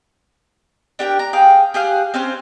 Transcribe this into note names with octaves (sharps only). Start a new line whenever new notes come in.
D4 G4 A#4 G5
A#5
G#4 F5 G5
G4 G#4 F5 F#5
C4 C#4 C5 F5